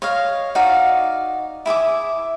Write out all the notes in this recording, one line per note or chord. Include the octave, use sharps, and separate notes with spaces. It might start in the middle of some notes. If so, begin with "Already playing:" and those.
C#5 D#5 F5
D#4 F#4 D5 F5
E4 G#4 E5 D6